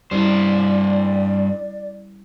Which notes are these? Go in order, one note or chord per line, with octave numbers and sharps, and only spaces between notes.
G2 G3 C#4 E4 C5 D5